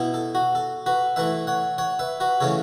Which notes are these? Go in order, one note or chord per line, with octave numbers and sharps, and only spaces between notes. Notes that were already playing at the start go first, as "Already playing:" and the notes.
Already playing: B2 B3 E4
A4
F#4
A4
F#4 B4
E3 A3 E4 B4 E5
C#5 F#5
C#5 F#5
B4 E5
F#4 B4
C#3 E3 A3 C#4 A4 C#5